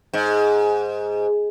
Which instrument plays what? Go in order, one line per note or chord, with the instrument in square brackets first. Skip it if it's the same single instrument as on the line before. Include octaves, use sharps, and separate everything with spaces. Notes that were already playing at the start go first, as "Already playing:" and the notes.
[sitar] G#2